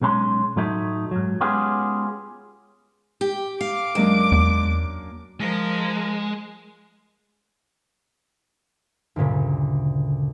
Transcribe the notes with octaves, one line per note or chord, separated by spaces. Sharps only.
B1 G#3 C#4 A#5 C6
A2 F#3 A3 D#4
G#2 F#3
G#3 B3 C#4 F4 G4 G#4
G4
F5 D6
F#2 G#3 A#3 D4
E2
F3 G#3 A#4
D2 G2 A#2 C#3